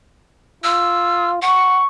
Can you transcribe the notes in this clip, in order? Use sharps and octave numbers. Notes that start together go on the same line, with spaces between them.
F4 E6
F#5 C#6